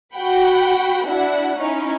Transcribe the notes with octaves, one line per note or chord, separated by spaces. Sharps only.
F#4 F#5 G5 B5
D4 E4 F#4 F#5
C#4 D#4 E4